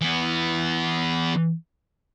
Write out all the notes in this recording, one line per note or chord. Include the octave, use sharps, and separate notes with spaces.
E3 B3